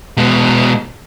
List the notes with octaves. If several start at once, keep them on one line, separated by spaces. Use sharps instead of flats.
B2 G#3